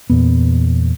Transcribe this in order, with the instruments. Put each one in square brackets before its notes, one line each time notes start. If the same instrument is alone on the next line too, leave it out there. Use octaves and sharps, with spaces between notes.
[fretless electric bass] E2 A#2 B3